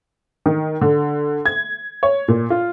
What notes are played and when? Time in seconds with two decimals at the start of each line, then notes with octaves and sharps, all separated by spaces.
0.46 D#3
0.81 D3
1.46 G#6
2.03 C#5
2.28 A#2
2.50 F4